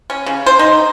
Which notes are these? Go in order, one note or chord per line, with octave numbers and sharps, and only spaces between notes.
C#4
C#3
C5
D#4